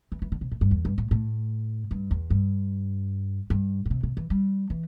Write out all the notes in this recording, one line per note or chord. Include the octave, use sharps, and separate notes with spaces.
E3
E3
D3
C3
A2
G2
E2
G2
A2
A2
G2
E2
G2
G2
A2
C3
C3
E3
G3
E3